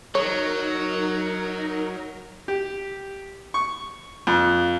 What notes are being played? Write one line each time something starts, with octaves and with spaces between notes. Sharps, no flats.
F#3 D#4 A#4 C#5
G4
C#6
F2